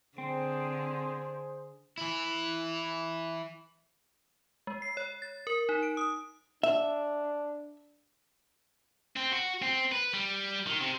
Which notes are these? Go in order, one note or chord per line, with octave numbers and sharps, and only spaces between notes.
D3 C4 G#4 C5
E3 E4
G#3
C7
C#5
A6
A#4
D#4
D7
D#6
D4 E5
C4
F#4
C4
B4
G3
D#3
C3